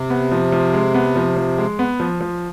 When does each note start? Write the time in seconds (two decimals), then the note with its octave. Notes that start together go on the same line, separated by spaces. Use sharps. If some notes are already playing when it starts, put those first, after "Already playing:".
Already playing: C3
0.10 B3
0.31 F3
0.52 F3
0.74 G#3
0.94 B3
1.16 F3
1.37 F3
1.58 G#3
1.79 B3
2.00 F3
2.21 F3